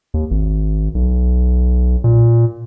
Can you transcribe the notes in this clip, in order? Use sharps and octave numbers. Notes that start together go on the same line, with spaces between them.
D#2
G#1
B1
A#2